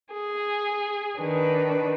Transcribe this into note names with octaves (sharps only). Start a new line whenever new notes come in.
G#4
D#3 D4 B4